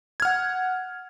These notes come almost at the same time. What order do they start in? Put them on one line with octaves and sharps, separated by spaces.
G#6 F6 F#5